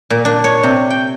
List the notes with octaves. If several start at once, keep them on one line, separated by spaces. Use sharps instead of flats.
A#2
D4
C#5
C3
G5